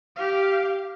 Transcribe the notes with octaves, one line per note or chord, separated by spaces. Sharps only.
G4 F5